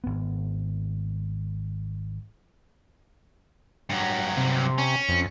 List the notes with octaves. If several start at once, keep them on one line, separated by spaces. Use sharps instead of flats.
G#1 B3
G2 F#3
C3
C#4
F2